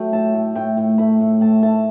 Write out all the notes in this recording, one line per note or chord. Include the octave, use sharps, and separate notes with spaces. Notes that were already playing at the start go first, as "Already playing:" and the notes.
Already playing: F#3 A3 G5
A2 A5
A2
A2 G5
A2
A3 B5
A2
A2 A5
A3 A5